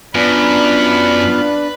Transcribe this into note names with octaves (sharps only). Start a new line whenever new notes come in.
F#2 B3 D4 F4 B4